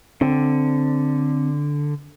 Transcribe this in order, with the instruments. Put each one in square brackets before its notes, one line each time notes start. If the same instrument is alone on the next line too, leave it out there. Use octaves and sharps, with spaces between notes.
[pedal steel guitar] D3 [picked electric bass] C4